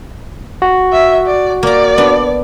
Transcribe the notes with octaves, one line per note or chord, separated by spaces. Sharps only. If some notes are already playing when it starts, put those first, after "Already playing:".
F#4
E5
D5
A#3 D5 A#5
B3 D4